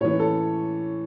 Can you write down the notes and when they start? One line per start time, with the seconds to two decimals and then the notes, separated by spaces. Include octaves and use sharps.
0.01 A2 E3 C#5
0.20 A4